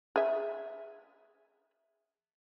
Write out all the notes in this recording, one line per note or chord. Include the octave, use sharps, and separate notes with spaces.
G#4 E5